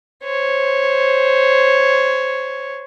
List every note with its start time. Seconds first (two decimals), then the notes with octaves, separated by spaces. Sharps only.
0.24 C5 C#5